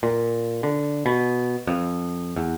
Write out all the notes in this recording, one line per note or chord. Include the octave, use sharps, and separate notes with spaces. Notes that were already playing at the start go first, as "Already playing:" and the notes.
A#2
D3
B2
F2
E2